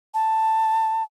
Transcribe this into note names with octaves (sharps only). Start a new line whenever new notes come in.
A5